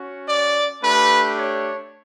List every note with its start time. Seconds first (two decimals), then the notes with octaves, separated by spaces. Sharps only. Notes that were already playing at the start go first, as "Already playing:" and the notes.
Already playing: C#4 F#4
0.28 D5
0.82 A3 D4 G4 B4
1.37 C#5